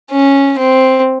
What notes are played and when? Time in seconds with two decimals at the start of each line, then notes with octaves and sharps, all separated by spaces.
0.11 C#4
0.58 C4